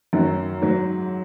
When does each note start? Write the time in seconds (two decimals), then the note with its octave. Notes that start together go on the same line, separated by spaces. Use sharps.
0.13 F#2 D#3 F#3
0.61 G#2 F#3